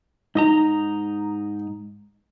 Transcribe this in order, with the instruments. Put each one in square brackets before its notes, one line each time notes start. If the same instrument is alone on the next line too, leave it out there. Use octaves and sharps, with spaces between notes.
[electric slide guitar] G#2 D#5 A#5 [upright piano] D#4